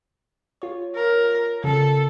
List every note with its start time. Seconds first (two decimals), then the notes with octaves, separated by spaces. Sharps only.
0.62 F4 C#5
0.96 A#4
1.64 C#3 A4